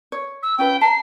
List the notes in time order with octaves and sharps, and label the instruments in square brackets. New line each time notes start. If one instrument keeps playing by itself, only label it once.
[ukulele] C#5
[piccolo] E6
[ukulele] C#4 F4 B4 [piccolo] G5
[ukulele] A5 A#5 [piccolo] C7